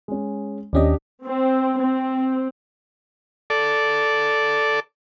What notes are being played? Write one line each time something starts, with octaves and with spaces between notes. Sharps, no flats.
G#3 C#4
D#2 C#4 D4 G4 D5 D#5
C4
C4
A4 D5